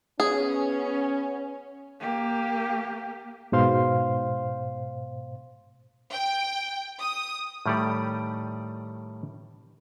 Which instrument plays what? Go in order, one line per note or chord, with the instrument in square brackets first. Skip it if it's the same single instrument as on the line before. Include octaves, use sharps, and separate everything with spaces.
[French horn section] B3 C#4 [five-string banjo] G#4
[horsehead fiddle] A#3 G4
[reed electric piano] G#2 B2 C5 F5 C6
[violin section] G5
D#6
[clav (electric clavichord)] A2 D#3 G3 G4 A4 D5